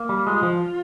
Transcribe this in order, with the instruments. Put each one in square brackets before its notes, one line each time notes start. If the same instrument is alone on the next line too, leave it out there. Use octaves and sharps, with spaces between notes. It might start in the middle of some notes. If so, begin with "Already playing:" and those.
Already playing: [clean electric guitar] A#3
G3
[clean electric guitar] G#3 [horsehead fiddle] F4
[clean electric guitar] F3